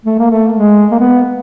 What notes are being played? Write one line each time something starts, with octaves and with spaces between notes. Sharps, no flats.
A3
A#3
A3
G#3
A#3
B3